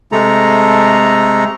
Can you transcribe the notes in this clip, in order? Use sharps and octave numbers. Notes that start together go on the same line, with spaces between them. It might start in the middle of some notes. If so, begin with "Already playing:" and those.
C3 G#3 A3 A4 A#5